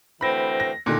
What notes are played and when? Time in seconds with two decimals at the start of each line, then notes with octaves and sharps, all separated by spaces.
0.21 D2 E3 C4 B5 A#6
0.60 A#6
0.86 A#2 D3 D#3